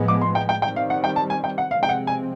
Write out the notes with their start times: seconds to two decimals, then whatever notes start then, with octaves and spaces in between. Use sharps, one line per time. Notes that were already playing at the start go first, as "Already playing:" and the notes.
Already playing: A2 F3 G#3 B3
0.08 D6
0.21 C6
0.35 G5
0.49 G5
0.62 D#3 G3 C4 G5
0.76 F5
0.90 F#5
1.04 G5
1.16 A5
1.30 G#5
1.44 G5
1.58 F#5
1.71 C3 F3 G#3 C4 F5
1.83 G5
1.89 F#5
2.07 G#5